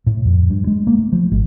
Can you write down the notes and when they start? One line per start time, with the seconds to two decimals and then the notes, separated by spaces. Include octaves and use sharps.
0.07 A2
0.25 F2
0.50 G2
0.67 G#3
0.87 A#3
0.99 A3
1.12 F3
1.32 G#1